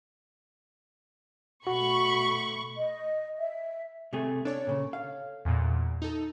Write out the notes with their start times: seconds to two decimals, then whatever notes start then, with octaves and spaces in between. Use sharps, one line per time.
1.67 B2 A3 F#4 B5 C#6
2.77 D#5
3.38 E5
4.13 C3 A3 G#4
4.45 D4 A4 C#5
4.67 A#2 C#3
4.93 F5
5.45 E2 A#2
6.02 D#4 A4